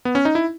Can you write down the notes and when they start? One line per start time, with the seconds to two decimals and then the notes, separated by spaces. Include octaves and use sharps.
0.05 B3
0.15 C#4
0.25 D#4
0.35 E4